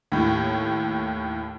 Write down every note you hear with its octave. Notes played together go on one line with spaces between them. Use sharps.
D#2 A2